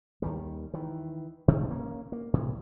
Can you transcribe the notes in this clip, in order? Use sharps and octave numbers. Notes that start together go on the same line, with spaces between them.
D#2 D#3 G3
D#3 E3
B2 D#3 A3
A#3 C#4
A#3
A2 C3 E3